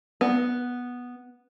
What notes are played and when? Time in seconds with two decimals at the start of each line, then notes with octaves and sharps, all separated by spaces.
0.21 B3